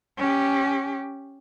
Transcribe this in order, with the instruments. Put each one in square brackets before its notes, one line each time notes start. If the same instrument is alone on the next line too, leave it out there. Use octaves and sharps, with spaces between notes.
[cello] C#4 G4